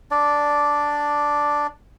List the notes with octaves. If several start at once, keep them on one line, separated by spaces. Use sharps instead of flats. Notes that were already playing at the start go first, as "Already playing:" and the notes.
D4 D5